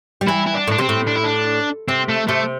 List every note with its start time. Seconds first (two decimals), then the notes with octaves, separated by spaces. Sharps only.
0.21 G3
0.28 E3 E4
0.47 E4
0.54 D4
0.67 A2 D4
0.78 C3 C4
0.89 A2
1.08 D4
1.16 E4
1.24 D4
1.88 C3 C4
2.09 A3
2.28 C3 A3